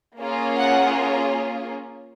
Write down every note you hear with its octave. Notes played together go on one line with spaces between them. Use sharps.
A#3 C#4 F4 G#4
F#5